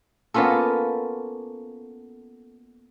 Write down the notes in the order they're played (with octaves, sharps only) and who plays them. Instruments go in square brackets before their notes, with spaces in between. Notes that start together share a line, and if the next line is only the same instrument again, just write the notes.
[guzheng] A#3 B3 C#4 F4 A4